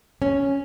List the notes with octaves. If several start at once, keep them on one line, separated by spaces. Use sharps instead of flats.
C#4